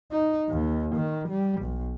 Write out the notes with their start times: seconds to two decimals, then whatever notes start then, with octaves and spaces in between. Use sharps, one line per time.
0.12 D#4
0.49 D#2
0.96 D#3
1.29 G3
1.62 B1